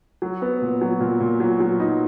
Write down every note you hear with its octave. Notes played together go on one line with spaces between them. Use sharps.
F#3
B3
A#2
F#3
A#2
A#2
F#3
F#3
D#4